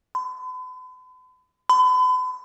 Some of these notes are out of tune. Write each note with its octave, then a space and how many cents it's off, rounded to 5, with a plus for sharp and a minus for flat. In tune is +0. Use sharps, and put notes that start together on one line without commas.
B5 +45
B5 +40